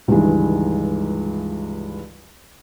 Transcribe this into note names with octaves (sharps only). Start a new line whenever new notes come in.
C#2 G2 D#3 E3 G#3